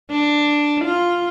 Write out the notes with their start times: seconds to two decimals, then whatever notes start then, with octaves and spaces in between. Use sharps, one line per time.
0.11 D4
0.85 F4